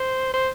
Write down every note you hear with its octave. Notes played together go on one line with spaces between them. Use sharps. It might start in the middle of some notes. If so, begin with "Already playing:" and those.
Already playing: C5
C5